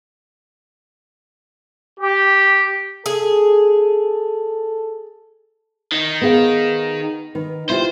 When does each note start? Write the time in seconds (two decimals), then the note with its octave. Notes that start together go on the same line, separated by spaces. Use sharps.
1.99 G4
3.06 G#4 A4
5.92 D#3
6.21 B3 G#4 F5
7.35 D#3 B4
7.70 E4 F4 G4 C5